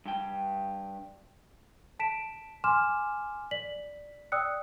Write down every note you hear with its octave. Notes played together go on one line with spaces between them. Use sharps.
G2 G5
A5 B6 D7 E7
G#5 C6 D6 F6 E7
D5 B6 F#7
D5 G5 D#6 E6 F#6 C#7